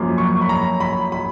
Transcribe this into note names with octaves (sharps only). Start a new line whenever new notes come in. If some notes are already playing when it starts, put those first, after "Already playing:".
Already playing: F#2 F3 A#3
C#6
B5
A#5
B5
B5